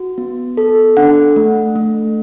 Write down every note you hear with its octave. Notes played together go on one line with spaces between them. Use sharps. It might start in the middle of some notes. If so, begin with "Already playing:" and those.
Already playing: F#4
B3
A4
D4 F#5
A3
A3